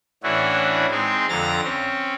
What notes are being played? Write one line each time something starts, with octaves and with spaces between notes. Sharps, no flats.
A2 E3 C#4 D4 E4 F#4
G#3 C4 D#4 G#4
F2 D3 A#5 A6 A#6
C4 C#4